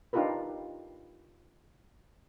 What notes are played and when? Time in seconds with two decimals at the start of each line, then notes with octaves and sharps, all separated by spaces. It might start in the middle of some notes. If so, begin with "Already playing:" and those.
0.13 D4 D#4 F4 G4 A#4 B4